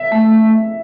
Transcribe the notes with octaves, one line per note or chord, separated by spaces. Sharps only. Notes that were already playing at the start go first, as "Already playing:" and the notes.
Already playing: E5
A3